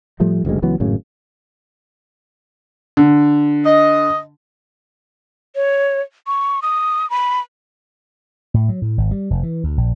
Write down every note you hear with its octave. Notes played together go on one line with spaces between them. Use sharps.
A2 F3 G3 A3
F#1 D2 G3 G#3
C#2 E3 F#3 B3
G#1 F#2 A2 C#3
D3
D#5
C#5
C#6
D#6
B5
A2
F#3
A2
G#1
G3
F1
E3
D2
A#1